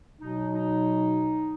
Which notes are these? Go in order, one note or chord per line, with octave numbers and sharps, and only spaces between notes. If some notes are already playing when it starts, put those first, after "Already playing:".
B2 F#3 D#4
D#4